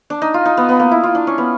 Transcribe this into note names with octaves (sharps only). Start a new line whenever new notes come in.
D4
D#4
F4
D#4
B3
B3
A#3
E4
F4
D4
C#4
B3